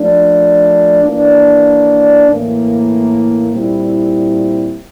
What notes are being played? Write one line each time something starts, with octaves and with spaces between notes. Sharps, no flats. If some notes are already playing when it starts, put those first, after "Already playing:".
Already playing: F3 A3 D4
E3 A#3 D4
A2 E3 A#3
A#2 G3 C4 E4